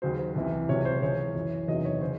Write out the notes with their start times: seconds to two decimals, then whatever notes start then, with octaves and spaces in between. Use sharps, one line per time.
0.02 D#2 C#3 F#3 C5
0.18 C5
0.35 C2 C3 E3
0.69 C#2 C3 F#3 C#5
0.85 C5
1.02 C#2 C#3 E3 C#5
1.35 F#2 E3
1.68 E2 C3 D#3 F#3 D#5
1.85 C#5
2.02 C#3 C5